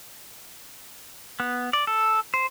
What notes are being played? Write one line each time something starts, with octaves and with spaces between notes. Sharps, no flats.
B3
D5
A4
C5